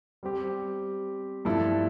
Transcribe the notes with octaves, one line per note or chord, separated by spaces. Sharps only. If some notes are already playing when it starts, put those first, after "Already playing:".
G3 C4 G4
G2 F3 A3 E4 A4